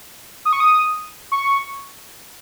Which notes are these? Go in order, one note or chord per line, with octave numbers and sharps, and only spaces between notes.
D#6
C#6
D#6
C#6